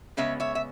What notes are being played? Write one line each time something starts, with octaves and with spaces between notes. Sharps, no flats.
C#3 G#3 B3 C#5 E5
C#5 E5
E5